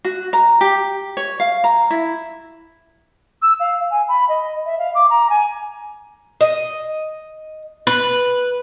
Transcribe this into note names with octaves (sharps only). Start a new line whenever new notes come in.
F#4
A#5
G4
C#5
F5
A#5
E4
E6
F5
G#5
B5
D#5
E5
F5
D6
A#5
G#5
D#5
B4